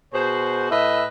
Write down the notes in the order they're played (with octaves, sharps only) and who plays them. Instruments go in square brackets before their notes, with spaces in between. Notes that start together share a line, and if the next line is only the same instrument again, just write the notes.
[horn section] B2 F#4 G#4 C5
A2 B4 D#5 E5